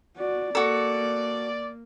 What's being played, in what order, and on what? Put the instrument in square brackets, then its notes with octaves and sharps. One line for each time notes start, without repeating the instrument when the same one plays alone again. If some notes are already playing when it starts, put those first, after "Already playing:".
[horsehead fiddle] F#4 D5
[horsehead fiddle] A#3 [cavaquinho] F#4 A4 [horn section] D5